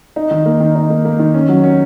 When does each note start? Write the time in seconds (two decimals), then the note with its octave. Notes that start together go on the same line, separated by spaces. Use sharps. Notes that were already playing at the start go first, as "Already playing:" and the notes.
0.16 D#4
0.31 D#3
0.46 A#3
0.60 D#3
0.75 D#4
0.90 A#3
1.05 A#3
1.19 D#3
1.34 C#4
1.49 F#3
1.64 C#4